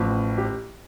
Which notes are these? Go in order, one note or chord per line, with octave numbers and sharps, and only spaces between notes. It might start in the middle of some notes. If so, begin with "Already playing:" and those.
Already playing: A1 A2 F3
G4